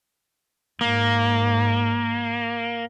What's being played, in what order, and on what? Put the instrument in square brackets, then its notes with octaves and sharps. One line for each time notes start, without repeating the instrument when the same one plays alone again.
[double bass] G#2 [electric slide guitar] A#3